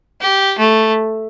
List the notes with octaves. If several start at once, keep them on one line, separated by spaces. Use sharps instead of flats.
G4
A3